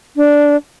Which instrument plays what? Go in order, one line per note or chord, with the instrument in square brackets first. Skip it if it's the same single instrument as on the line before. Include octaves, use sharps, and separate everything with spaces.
[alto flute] D4